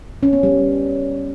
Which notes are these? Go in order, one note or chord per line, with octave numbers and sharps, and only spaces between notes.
C#4
B3
G3